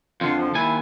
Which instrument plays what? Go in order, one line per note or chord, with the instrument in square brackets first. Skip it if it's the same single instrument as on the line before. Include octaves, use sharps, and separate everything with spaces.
[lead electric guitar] F2 D3 [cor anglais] F4
[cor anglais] F3
[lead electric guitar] D#2 G#5 [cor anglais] E4